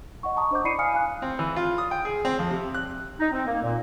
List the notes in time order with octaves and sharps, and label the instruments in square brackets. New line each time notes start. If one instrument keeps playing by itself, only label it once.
[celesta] D#5 F#5 C#6
A5 A#5 C#6 D#6
D4 C5 D#5 D6 G6
E4 D5 B5 C7 C#7 D#7
F5 G#5 D#6 F6 C#7
F5 G#5 F#6
[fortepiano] C4
E3
F4
D#6
G5
G#4
C4
F2
C3
F#6
[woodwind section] D#4
C4
A#3
A#2